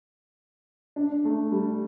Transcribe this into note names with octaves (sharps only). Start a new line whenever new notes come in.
D4
A3
G3